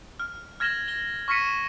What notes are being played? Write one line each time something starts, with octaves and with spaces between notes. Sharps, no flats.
F6
F6 G#6 A#6 E7 F#7 G7
G#6 F#7 G7
C#6 F6 A#6 B6 C#7 D#7
E7